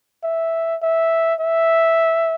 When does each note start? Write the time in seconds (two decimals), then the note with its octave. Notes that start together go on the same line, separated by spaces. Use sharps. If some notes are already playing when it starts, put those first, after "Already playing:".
0.24 E5
0.82 E5
1.40 E5